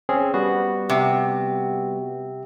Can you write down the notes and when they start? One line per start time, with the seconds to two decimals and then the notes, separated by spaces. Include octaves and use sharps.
0.09 C4 C#4 G#4
0.34 G3 B3 F#4
0.90 C3